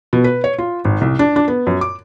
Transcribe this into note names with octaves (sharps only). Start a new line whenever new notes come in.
B2
B4
C#5
F4
G#1
C2
D4
D4
B3
F#2
D6